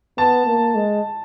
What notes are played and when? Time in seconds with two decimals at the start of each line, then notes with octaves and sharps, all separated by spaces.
0.18 B3 A5
0.46 A#3
0.75 G#3